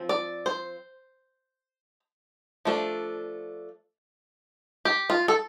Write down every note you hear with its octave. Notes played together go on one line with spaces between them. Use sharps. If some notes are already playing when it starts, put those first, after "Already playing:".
Already playing: F3 C4
D5
C5
F3 A3 D4
G4
F4
A4